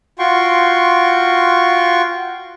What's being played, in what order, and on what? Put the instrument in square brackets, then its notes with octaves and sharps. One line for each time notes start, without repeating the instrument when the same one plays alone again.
[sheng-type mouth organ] F4 F#4 G5 C6 C#6